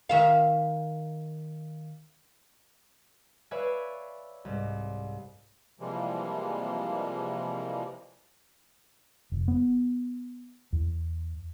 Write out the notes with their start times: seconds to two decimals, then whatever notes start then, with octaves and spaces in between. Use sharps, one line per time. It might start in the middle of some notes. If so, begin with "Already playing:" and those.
0.09 D#3 E5 F5
3.51 B4 C#5 D5 E5 F5 G#5
4.45 C2 G#2
5.80 C3 E3 F3 G3 G#3 A#3
9.32 F1
9.48 B3
10.73 E2